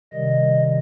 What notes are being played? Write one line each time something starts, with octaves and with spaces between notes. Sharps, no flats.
C3 D#3 G3 D#5